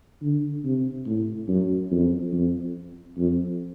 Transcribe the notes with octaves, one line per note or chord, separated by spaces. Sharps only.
D3
C3
A2
F#2
F2
F2
F2